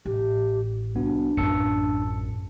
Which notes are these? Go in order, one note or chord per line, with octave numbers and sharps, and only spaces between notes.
A1 G4
C2 B3 D4 F#4
A1 F#2 F4 A5 E6 C#7
A#1